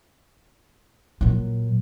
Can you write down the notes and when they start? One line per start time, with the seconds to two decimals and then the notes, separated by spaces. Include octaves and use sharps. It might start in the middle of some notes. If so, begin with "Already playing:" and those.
1.21 A#2 F#3